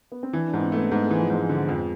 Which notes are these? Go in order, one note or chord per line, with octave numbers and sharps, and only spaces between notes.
B3
C4
E3 D4
D4
G#2 B3
C4
A3
B3
G#2 B3
E3 G#3
F3
G#2 G#3
D3
F2